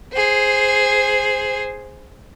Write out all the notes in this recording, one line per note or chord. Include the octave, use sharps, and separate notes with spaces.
G#4 C5